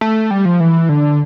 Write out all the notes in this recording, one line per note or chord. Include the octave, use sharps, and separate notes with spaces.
A3
G3
F3
E3
D3